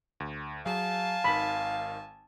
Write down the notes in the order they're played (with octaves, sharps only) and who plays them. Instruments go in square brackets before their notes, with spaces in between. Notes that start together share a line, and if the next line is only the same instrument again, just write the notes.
[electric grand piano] D2
[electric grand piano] F#3 G#4 [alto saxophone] F5 [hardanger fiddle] G#5 A5
[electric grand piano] G#1 D#3 [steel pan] B5